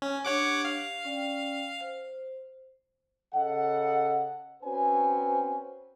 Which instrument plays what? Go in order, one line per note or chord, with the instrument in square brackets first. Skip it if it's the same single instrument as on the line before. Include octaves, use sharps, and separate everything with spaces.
[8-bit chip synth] C#4
[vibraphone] D4 G4 [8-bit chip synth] C#5 F#5 D6
[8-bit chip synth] F5
[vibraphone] C#4 D5 G5
C5
[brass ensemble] C#3 A4 D#5 F#5
C4 C#4 F#4 B4 C5 G#5